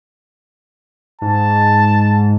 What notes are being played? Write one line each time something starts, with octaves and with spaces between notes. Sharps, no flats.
G#2 A5